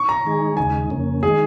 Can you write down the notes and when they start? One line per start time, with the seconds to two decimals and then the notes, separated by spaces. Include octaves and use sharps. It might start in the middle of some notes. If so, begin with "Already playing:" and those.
Already playing: C#6
0.09 A#5
0.25 D#3 G#3 D#4 G#4
0.57 D#2 C#3 G#3 D#4 G#5
0.90 F2 C#3 A#3 C#4
1.23 D#3 G#3 D#4 G#4